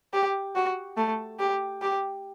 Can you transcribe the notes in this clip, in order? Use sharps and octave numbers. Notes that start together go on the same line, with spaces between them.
G4
F#4
A3
G4
G4